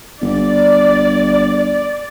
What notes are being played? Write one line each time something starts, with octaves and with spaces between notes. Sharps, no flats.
G1 D5